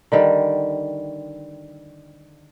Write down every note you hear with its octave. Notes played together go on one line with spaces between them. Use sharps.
D3 D#3 G3